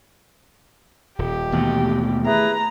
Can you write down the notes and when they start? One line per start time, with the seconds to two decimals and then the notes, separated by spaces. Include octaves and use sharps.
1.19 D#1 G4
1.52 D#2 B2 E3 A3
2.26 E4 G#4 B4 A#5